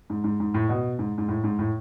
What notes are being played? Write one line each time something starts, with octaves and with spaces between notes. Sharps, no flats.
G#2
G#2
G#2
A2
B2
G#2
G#2
A2
G#2
A2